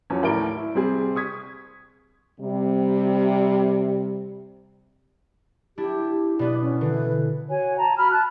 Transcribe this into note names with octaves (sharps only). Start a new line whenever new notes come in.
E2 F3 F#3 C#4
D#2 A2 A#4 D5 D7 G7
E4
C3 G3 C4 G#4
C#6 D#6 G#6 B6
C3 G3
D4 E4 G4
B2 B3 D5
C#4
D3 E3 B4
F#4 C#5 G#5
A5 A#5
F#4 B5 F6
A5 F#6